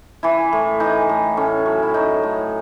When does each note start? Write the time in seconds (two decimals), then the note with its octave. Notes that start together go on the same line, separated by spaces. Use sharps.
0.23 E3 E4
0.53 A2
0.80 E3 D#4
1.09 A2
1.37 A2 C#4
1.66 F#3
1.83 E4
1.94 F#3 D#4
2.23 A2